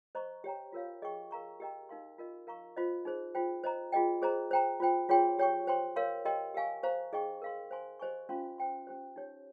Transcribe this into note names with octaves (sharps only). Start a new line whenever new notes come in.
C5 D#5 A#5 C#6
G4 C#5 G5 A#5
F4 A#4 C#5 F5
G#4 D#5 G5 C#6
A#4 F5 A#5 C#6
G4 A#4 D#5 G5 A#5
D#4 A#4 F5 C6
F4 A#4 D#5
A#4 F5 A#5 C#6
F4 C5 D#5
D#4 G#4 C5
F4 C5 G5
C5 D#5 A#5
F4 G#4 D#5 G5
G#4 C5 D#5 A#5
C5 G5 A#5
F4 C5 G5
F4 G#4 C#5 G5 C6
G4 C#5 G5 C#6
C5 G5 C6
A#4 C#5 F5 C6
G4 A#4 D#5 G5 C6
G4 A#4 F5 G#5 C#6
C5 F5 A#5 C#6
D#4 G#4 D#5 G5 C#6
A#4 F5 C6
C5 F5 G#5 C6
G4 C5 D#5 G#5 C#6
C#4 F4 C5 F5 C6
C5 G5 C6
C#4 G4 C5
D#4 G4 C#5